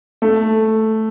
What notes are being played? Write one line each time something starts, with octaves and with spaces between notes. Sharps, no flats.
A3